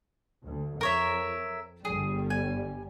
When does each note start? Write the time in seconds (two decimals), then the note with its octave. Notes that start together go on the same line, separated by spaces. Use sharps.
0.46 D2
0.81 F2 A#4 C#5 E5
1.85 G1 G3 G#4
2.30 G#5